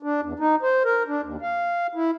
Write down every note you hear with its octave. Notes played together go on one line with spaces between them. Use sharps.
D4
E2
D#4
C5
A#4
D4
D#2
F5
E4